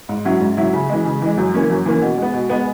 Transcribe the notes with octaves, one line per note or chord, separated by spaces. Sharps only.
G#2
F#3 C#4 E4
G#2
F#3 C#4 E4
C#3
E3 G#3
C#3
E3 G#3
F#2
E3 A#3 C#4
F#2
E3 A#3 C#4
B2
G#3 B3
B2
G#3 B3